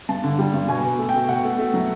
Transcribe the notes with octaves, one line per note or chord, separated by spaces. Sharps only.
G2 A5
D3
G3
G2
B2 G#5
B2
A3
G5
A3
B2 F#5
A3
A3
F#3